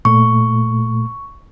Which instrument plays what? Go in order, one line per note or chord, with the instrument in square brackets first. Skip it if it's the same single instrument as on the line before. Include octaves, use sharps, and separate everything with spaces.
[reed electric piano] A#2 A3 [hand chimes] C#6